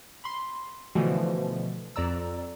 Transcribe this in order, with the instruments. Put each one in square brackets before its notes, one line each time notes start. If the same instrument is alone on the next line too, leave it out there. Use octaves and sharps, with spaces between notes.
[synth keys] B5 C6
B2 D3 E3 F3 A3
F2 D5 A#5 E6